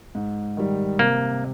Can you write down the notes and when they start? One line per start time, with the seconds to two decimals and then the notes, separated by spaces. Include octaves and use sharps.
0.15 G#2
0.57 D#3 G3
0.99 C3 A#3